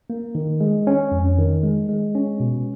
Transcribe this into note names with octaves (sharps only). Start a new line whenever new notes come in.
A#3
D#3
G#3
C#4
F2
D#3
G#3
G#3
C#4
B2